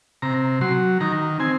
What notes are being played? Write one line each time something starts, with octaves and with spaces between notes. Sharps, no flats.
C3 A#5
F#3 C6
D#3 A#5
C4 G#5